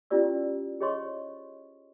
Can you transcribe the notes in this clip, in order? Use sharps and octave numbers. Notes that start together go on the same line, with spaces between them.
C#4 E4 F4 G4 D5 E6
G#4 C5 C#5 D#5 C6 C#6